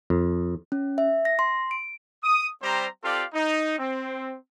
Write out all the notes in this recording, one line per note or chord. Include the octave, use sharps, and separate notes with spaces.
F2
C#4
E5
A#6
C6
D7
D#6
G3 C4 G4 C5 A#5
C4 F4 G4 A4 D5 F5
D#4
C4